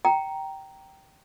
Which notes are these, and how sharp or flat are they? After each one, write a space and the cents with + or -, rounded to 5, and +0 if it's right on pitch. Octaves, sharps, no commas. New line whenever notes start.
G5 -15 A#5 +0